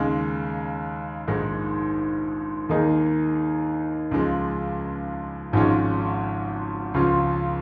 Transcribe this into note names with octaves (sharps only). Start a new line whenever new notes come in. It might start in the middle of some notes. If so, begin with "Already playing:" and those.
Already playing: D#2 C#3 G#3 D#4
A#1 G#2 D#3 G#3
D#2 D#3 A#3 D#4 G#4
C#2 C#3 F3 G#3
G#1 G#2 F3 G#3 C#4
C#2 C#3 F3 C#4 F4